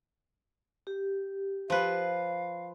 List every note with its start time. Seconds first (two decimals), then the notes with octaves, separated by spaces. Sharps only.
0.87 G4
1.70 F3 B4 F5